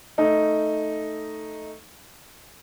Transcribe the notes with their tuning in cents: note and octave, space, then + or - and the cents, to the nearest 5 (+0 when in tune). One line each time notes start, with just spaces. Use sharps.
A3 +0 D#4 +0